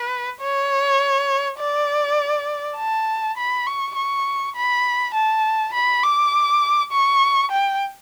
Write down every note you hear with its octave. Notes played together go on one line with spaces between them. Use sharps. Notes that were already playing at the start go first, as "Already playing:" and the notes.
Already playing: B4
C#5
D5
A5
B5
C#6
C#6
B5
A5
B5
D6
C#6
G5